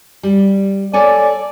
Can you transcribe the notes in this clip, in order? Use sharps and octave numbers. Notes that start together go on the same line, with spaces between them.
G3
A4 C#5 D5 G#5